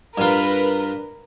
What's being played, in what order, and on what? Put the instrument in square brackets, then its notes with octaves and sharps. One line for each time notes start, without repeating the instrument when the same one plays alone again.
[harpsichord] G2 F4 [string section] A#4 B4